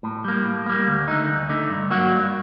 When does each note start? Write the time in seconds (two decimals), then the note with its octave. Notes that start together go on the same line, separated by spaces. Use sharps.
0.03 A2
0.24 G3 A#3
0.45 A2
0.66 G3 A#3
0.87 D2
1.08 D3 A3 D#4
1.28 D2
1.49 D3 A3 D#4
1.70 G2
1.90 F#3 A#3 F#4
2.11 G2